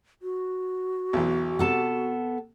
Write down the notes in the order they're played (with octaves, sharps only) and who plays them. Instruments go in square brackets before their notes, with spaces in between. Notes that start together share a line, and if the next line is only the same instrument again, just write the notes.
[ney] F#4
[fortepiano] B1 E2
[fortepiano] C3 [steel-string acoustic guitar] B3 A4 A5